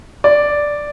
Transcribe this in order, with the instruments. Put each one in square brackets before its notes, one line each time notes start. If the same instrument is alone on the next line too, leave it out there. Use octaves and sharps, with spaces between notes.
[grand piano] D5